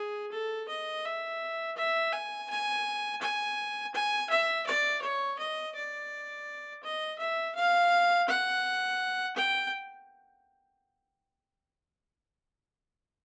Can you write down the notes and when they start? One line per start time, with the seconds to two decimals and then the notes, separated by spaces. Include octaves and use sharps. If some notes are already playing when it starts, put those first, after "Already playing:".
Already playing: G#4
0.32 A4
0.69 D#5
1.05 E5
1.77 E5
2.13 G#5
2.50 G#5
3.21 G#5
3.94 G#5
4.30 E5
4.67 D5
5.02 C#5
5.39 D#5
5.75 D5
6.83 D#5
7.19 E5
7.56 F5
8.28 F#5
9.36 G5